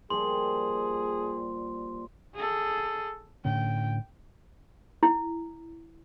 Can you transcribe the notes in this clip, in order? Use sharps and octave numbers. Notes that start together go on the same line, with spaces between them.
A#2 F3 G3 G#4 C6
G#4 A4
A2 D3 C#4 G5
E4